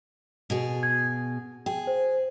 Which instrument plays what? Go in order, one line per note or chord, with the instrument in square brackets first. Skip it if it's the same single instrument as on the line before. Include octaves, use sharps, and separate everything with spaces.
[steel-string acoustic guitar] B2 G#4
[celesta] G#6
[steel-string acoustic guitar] G#4 [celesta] G5
[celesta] C5